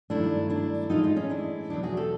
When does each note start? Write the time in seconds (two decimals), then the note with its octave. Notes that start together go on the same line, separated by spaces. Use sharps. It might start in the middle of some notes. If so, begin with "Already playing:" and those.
0.10 G2 D#3 F#3 A3 D4 E4
0.50 D4 E4
0.90 A2 E3 G#3 D#4 F4
1.03 D#4 F4
1.16 C#4 D#4
1.30 D4 E4
1.70 E2 B2 F#3 B3 D4
1.83 F#4 G#4
1.97 G4 A4